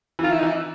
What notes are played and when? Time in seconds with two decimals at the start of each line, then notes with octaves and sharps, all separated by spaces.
0.19 E3
0.23 D#3 F4
0.31 E4
0.39 D#4
0.43 E3
0.47 E4